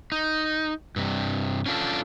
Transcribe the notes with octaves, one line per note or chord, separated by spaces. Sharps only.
D#4
G2 C3
C#4 D4 F4 A4